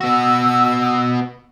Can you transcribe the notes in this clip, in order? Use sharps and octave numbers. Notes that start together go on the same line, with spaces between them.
B3 F#4 E6